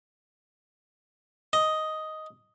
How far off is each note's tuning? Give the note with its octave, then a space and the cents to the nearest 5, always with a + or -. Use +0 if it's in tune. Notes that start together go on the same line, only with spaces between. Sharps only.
D#5 +5